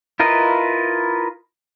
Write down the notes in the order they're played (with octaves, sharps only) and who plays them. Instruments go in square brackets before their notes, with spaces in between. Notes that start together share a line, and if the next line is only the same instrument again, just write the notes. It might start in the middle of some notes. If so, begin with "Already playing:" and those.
[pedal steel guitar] E4 F4 A#4 B4 D#5